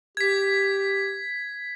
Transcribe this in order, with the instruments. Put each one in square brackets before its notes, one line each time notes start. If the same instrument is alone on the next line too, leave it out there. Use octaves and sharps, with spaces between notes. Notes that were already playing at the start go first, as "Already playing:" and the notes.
[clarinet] G4 [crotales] G#6 B6